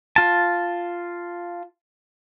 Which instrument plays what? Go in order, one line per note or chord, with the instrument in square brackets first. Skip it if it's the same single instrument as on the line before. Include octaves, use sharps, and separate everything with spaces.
[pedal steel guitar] F4 A5